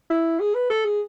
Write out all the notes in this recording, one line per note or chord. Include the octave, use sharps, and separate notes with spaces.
E4
G#4
B4
A4
G#4